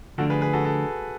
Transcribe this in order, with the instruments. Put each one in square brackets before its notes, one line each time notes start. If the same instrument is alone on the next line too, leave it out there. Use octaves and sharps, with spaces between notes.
[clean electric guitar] D3 F3 A3 D4 [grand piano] F#4 A4
[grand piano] G#4 B4
G#4 B4
F#4 A4
F#4 A4